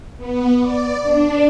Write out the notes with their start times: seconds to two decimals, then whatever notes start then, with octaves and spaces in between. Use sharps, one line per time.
0.17 B3
0.60 D5
1.03 D4